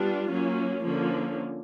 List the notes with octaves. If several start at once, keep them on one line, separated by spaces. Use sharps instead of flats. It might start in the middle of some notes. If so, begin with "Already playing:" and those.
Already playing: G3 B3 D4 F4
F#3 A#3 C#4
D3 F3 A#3 C#4